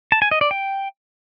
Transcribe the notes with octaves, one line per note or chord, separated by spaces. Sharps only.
A5
G#5
D#5
D5
G5